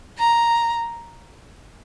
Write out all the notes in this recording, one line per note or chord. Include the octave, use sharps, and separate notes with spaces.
A#5